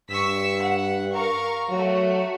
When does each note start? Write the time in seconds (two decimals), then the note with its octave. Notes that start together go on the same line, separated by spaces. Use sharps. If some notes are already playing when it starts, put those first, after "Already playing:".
0.10 G2 C#6 E6 B6
0.61 F#5
1.12 A#4 F5 C#6
1.70 F#3 A3 F#4